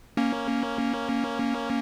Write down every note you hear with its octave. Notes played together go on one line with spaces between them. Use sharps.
A#3 C#4